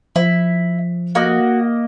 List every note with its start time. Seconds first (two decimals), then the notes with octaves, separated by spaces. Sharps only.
0.16 F3 E4
1.15 A#3 F#4 D#5